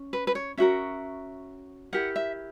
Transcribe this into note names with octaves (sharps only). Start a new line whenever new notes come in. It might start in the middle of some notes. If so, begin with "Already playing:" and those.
Already playing: C#4
B4
B4
C#5
C#4 F#4 A#4 E5
E4 G4 A#4 F#5
E5